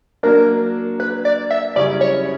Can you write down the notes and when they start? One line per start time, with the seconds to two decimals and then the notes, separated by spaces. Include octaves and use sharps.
0.23 F#3 A#3 D4 A#4
1.00 B4
1.25 D5
1.51 E5
1.76 F#2 C#3 G3 C#4 E4 D5
2.01 C#5